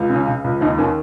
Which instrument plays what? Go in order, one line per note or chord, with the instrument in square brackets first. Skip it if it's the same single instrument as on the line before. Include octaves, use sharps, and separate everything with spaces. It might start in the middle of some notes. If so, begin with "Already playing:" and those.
Already playing: [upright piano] C#2
C#3
C#4
C#3
C#2
D#2 D#4
D#3 C#4